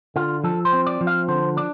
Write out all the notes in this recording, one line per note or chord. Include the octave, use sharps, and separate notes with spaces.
D3 F4
F3 A4
C5
C4
D5
F3
F5
D3 C5
D4 D5